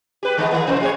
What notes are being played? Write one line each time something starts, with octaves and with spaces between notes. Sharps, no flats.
G4 B4
D3 G#3 B3
D#3 A#3
C3 F3 C5
A2 G#4 C#5